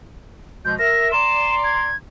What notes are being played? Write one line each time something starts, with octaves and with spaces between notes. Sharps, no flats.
B2 F3 G#3 G6
A#4 E5 A#6
D5 A#5 C6 E7
G#6